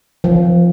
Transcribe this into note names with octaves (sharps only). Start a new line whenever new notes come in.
F3